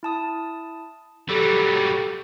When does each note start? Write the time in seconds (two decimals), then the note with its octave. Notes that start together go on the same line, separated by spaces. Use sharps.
0.03 E4 A5 D#6
1.29 F#3 G3 G4 A4